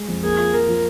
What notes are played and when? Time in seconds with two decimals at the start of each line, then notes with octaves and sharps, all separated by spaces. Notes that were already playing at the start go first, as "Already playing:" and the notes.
Already playing: G#3
0.08 F2
0.23 A#3 G#4
0.38 F4
0.53 F3 A#4
0.69 F3